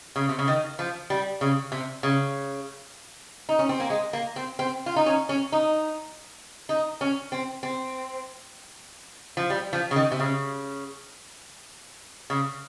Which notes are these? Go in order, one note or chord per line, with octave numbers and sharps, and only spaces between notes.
C#3
C3
C#3
D#3
F3
G3
C#3
C3
C#3
D#4
C#4
C4
A#3
G#3
A#3
C4
C4
F4
D#4
C#4
C#4
D#4
D#4
C#4
C4
C4
F3
G3
F3
C#3
D#3
C3
C#3
C#3